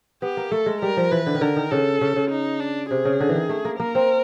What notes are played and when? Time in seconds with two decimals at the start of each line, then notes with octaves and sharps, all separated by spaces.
0.22 B3 G4
0.37 A#3
0.51 A3 A4
0.66 G#3
0.82 G3 A#4
0.97 F3
1.11 E3 B4
1.26 D3
1.35 D#3
1.41 D3 A#4
1.56 D#3
1.70 C#3 A4
2.01 C#3
2.16 C#3
2.31 D#4
2.60 D4
2.90 C3 G#4
3.05 C#3
3.20 D3
3.29 E3
3.35 D#3
3.49 A3
3.65 A#3
3.79 A#3 A#4
3.95 C4